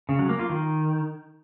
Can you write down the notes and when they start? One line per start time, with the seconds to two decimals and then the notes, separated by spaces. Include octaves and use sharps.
0.09 C#3
0.19 F#3
0.29 A#3
0.39 F4
0.50 D#3